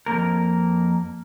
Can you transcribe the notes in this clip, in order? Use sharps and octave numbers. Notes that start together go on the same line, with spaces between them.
F2 A#2 A#3 A#4